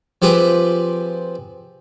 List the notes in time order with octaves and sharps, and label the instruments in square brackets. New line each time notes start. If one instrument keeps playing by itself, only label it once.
[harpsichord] F3 C4 G4 G#4 B4